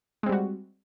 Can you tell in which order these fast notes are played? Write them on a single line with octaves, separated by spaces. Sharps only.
G#3 C4 G3 F#4